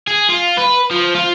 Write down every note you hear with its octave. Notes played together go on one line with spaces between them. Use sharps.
G#4
F4
B4
F3
F4